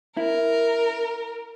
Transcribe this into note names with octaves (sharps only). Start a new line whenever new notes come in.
E4 A#4